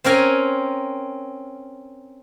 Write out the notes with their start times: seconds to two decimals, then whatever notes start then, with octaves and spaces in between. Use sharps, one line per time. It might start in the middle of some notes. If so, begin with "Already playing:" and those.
0.04 C4 C#4 A#4 G#5